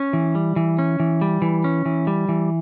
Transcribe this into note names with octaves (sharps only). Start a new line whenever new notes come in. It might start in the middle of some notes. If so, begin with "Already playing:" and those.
Already playing: C#4
E3
G3
E3
C#4
E3
G3
E3
C#4
E3
G3
E3